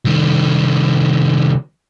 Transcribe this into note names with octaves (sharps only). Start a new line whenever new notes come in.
C2 D#3